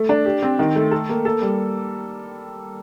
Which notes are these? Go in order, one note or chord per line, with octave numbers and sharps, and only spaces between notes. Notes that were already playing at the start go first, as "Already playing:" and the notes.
Already playing: A3
D4
G4
C4
D#3
A3
A4
A#3
A4
G3